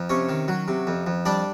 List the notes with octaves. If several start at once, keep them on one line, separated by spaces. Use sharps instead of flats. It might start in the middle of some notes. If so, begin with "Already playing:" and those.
Already playing: F2
C3 C#4 C#5
D#3
F#3
C3
F2
F2
G3 D4 D5